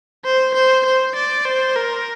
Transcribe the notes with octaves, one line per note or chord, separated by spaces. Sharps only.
C5
C5
C5
D5
C5
A#4